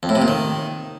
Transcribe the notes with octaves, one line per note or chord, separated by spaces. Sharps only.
F2
A2
C3
A#2
D#3